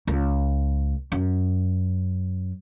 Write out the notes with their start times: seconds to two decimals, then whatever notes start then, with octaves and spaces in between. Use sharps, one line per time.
0.07 C#2
1.12 F#2